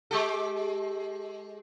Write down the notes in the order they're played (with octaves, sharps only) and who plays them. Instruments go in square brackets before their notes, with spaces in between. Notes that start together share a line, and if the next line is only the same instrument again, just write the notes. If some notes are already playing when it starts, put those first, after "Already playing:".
[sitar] G#3 G4 A4